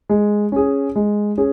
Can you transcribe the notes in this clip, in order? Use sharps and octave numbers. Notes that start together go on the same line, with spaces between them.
G#3
C#4 G#4
G#3
C#4 G#4